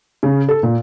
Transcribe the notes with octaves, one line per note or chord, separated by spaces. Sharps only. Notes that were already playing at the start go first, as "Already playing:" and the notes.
C#3
A4
A#2